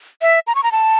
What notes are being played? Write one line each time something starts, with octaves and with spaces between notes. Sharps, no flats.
E5
A#5
C#6
A#5
A5